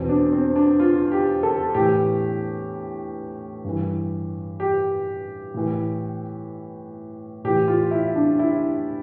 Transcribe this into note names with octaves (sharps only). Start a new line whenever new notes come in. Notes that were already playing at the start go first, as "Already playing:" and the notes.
Already playing: E2 B2 C4
D4
C4
D4
F4
G4
A4
A2 E3 G4
G2 E3
G4
A2 E3
A2 E3 G4
F4
E4
D4
E4